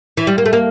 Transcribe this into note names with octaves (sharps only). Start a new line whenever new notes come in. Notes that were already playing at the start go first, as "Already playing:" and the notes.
E3
G3
A#3
A3
A#3